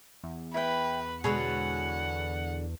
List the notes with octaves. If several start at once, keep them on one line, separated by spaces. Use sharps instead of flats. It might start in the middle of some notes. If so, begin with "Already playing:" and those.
E2
E4 B4 G5
B2 D3 G#3 G#4 B4 C#5 F#5